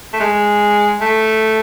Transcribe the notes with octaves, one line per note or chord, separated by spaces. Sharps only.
A3
G#3
A3